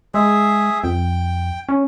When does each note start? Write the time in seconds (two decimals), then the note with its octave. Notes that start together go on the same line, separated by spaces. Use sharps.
0.14 G#3 G#4 E5
0.84 F2 G5
1.69 C#4